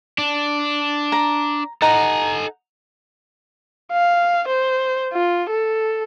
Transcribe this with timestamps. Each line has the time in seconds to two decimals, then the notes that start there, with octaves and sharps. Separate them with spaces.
0.18 D4
1.12 A#5
1.82 D#4 A4 F#5 G#5 A#5
3.92 F5
4.48 C5
5.13 F4
5.50 A4